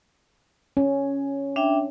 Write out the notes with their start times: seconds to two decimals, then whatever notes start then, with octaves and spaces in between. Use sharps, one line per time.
0.77 C#4
1.56 D4 E5 G5